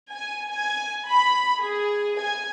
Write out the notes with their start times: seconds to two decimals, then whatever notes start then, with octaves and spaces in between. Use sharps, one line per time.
0.11 G#5
0.48 G#5
1.05 B5
1.59 G#4
2.18 G#5